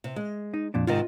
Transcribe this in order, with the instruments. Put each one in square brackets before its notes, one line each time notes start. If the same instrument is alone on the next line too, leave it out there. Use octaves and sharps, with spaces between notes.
[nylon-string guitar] C3
G#3
[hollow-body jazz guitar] D#4
F2 A#2 D4
[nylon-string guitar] G#2 C3 D#3 [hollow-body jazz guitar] F4 D#5